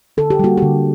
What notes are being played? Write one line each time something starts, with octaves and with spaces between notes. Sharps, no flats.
D3 A4
G4
G3 A#3 F#4
D3 G4